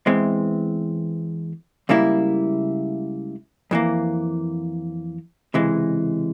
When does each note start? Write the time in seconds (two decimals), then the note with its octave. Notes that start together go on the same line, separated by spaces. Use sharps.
0.06 E2 E3 G#3 C4
1.89 C#2 C#3 G3 A#3 E4
3.71 F2 E3 A#3
5.54 C#2 C3 E3 G#3